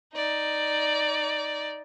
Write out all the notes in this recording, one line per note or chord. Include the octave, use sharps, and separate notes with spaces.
D#4 D5